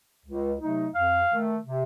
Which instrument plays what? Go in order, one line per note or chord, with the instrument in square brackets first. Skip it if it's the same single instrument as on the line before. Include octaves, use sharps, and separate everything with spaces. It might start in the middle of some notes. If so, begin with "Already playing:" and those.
[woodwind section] C#2
C3 F#3 A3 D#4
F2 F5
D#3 A3
C3